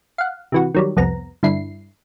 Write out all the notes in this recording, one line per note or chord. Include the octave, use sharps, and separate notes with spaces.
F5 F#5
C3 E3 F#4
D#3 F#3 G3
C2 F2 B3 A#5
G2 D3 E4 C7